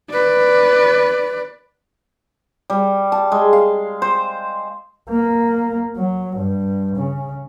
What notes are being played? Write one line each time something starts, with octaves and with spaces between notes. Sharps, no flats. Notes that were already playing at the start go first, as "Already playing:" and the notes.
B4 D5
G3
A5
G#3
F5
C5
A#3
F#3
G2
C#3